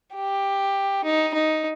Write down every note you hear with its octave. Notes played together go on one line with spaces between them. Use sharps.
G4
D#4
D#4